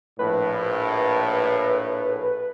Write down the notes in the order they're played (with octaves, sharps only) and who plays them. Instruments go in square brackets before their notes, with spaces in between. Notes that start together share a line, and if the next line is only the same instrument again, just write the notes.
[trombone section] A#1 A2 [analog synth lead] B4